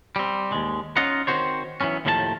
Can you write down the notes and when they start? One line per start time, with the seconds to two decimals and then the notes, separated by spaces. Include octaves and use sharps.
0.16 G3 C4
0.52 D#2 G#3
0.97 C#4 D#4 F4 D#5 F#5
1.27 D#3 C4 F#4 C5 C#5
1.81 E3 F#3 B3 C#4
2.05 D#2 A2 D#3 F3 G4 A5